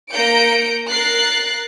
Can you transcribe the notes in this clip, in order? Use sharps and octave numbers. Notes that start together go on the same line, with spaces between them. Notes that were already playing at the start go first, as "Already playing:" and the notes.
A#3 A#5 G6 C#7 D7
A#4 F#6 A6 C7